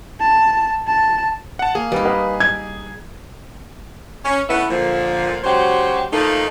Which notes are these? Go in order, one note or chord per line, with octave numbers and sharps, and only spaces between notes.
A5
A5
F#5 A5
A#3 G#4
G3 D#4 B4
B4 F5
G#6
C#4
A3 B3 C#4 D#4 E4 B4
A#2 D3 F3
C#3 F#3 G#3 F#4 G4 C5
F3 A3 A#3 D#4